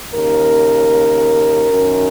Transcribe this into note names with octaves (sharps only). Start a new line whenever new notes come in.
D#2 C#3 A#4
F#2 D#3